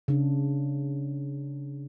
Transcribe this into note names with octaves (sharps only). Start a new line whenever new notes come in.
C#3 D4